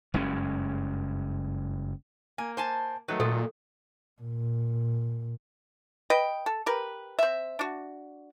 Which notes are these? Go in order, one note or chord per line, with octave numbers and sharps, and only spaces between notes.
F#1 G2 G#3 C#4
A#3 G#5
C5 G#5 A5
D#3 F#3 A3 B4
A#2 F4 A4
A#2
B4 D#5 G5
A4
G4 A#4 B4
C4 E5
D4 F#4